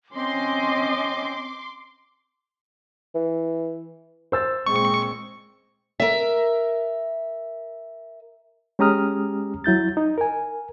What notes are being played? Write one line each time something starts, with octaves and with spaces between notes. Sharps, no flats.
C4 C#4 D#5 C6 D6
E3
C5 E6 A6
A#2 G#3 C4 C#6
A#4 E5
G#3 C#4 G4 A#5 D#6 F6
F#3 E4 G6 A6
D#4
A#4 G#5